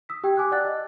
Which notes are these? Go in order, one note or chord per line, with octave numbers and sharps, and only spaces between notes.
D#6 E6 B6
G4 G5 G#6
G#5 D6 E6 F#6
D5 F#5 A5 F#6 A6
D#5